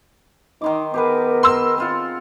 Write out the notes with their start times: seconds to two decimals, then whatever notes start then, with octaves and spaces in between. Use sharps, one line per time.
0.62 D#3 D#4 C6 D6
0.94 B3 G4 G#4 A#4 B4
1.43 C6 E6
1.78 C4 D#4 F4 F#5